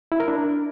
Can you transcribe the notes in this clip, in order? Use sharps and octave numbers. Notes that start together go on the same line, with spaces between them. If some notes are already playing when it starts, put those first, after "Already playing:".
E4
A#4
D4